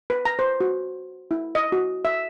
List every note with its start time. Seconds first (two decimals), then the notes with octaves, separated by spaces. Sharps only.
0.10 B4
0.25 A#5
0.39 C5
0.61 F#4
1.31 E4
1.55 D#5
1.72 F#4
2.05 E5